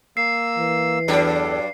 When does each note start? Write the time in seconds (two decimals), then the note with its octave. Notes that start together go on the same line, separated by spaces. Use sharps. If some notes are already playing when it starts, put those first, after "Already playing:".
0.17 A#3 E6 C7
0.57 E3
1.08 E2 G2 F#3 D4 A4